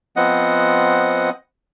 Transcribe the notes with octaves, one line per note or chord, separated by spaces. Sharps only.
F3 B3 C4 D#5 F#5